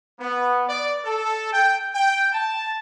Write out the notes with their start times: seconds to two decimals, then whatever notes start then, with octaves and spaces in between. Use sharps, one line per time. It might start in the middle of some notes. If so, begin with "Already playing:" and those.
0.20 B3
0.69 D5
1.05 A4
1.53 G5
1.95 G5
2.32 A5